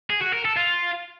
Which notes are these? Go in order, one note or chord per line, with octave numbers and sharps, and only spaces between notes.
G#4
F#4
A#4
A4
F4